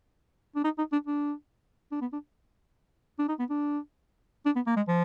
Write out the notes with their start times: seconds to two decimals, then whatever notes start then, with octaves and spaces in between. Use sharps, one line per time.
0.55 D4
0.64 D#4
0.78 D#4
0.92 D4
1.07 D4
1.92 D4
2.01 B3
2.13 D4
3.19 D4
3.28 D#4
3.39 B3
3.50 D4
4.46 D4
4.56 B3
4.66 A#3
4.76 G#3
4.88 F3